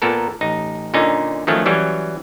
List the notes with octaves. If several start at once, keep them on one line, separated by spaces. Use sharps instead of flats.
A#2 B3 A4 A#4
A1 D#4
A#2 D3 C#4 D#4
D#3 F3 F#3 A3 C#4
E3 F#3 G3 C#4